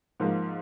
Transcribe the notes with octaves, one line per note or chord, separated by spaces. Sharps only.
G#2 F3 A#3